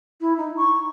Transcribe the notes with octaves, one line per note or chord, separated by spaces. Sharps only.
E4
D#4
C#6